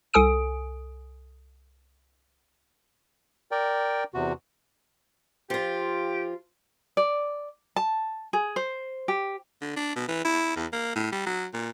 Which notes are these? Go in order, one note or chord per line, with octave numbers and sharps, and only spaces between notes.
C2 A4 G#5 D#6 D7
A#4 D5 G5
E2 C3 F#4
F3 F4 G4
D5
A5
G#4
C5
G4
D3
D4
B2
E3
E4
E2
A#3
A2
G3
F#3
A#2